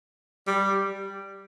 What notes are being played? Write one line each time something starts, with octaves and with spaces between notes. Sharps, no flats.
G3